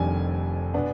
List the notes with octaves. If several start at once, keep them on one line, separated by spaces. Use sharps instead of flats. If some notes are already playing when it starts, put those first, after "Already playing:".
Already playing: F1 F2 D#3 G3 D4 G#5
B2 B3 D4